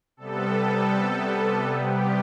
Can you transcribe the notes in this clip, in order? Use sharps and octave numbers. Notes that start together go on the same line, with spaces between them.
C3 G3 B3 A4
G4